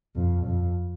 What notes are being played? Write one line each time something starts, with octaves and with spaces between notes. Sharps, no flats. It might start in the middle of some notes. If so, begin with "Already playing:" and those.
F2
F2